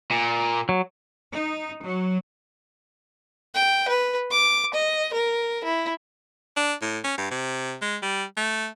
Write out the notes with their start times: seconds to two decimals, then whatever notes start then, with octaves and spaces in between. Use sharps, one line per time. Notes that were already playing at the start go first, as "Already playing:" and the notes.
0.12 A#2
0.69 F#3
1.30 D#4
1.83 F#3
3.55 G5
3.88 B4
4.31 D6
4.74 D#5
5.13 A#4
5.64 E4
6.56 D4
6.82 A2
7.04 C#4
7.18 G2
7.31 C3
7.81 G#3
8.02 G3
8.37 A3